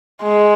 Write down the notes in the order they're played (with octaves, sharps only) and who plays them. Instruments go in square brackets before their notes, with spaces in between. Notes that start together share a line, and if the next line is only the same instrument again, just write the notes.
[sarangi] G#3